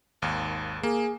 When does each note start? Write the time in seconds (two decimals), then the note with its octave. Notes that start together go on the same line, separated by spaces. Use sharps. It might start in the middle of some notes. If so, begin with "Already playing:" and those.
0.22 G#1 D#2
0.83 A#3 G#4